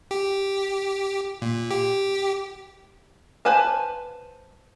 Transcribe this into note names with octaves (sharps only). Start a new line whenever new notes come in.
G4
A#2
G4
B4 C5 G#5 A5